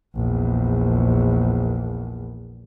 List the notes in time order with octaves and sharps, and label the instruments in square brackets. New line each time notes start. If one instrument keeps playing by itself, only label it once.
[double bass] A#1 E2